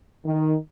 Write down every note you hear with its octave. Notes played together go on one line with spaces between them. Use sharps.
D#3